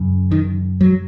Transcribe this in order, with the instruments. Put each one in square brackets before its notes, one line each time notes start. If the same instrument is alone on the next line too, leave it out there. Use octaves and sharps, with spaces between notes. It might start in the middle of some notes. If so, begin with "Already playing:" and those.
Already playing: [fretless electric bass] F#2 C#3
D#3
F#3